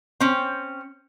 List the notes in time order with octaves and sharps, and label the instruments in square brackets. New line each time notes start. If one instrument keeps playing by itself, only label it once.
[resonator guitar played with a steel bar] C4 C#4